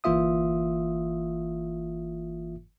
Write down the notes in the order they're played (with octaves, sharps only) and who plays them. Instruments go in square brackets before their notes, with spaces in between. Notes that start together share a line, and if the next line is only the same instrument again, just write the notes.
[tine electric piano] G1 E3 A#3 F4 E5 D#6